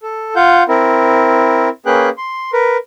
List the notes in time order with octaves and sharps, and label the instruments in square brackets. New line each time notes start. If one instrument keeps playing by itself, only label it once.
[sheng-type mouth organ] A4
F4 F5 F#5 G6
C4 E4 A#4
A#3 C#4 G#4 B4 G5 F#6
C6
A#4 B4